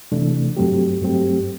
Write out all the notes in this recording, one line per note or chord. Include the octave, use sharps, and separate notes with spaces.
C3 E3 A3 D4
G2 F#3 A3 C4 G4
G2 F#3 A3 C4 G4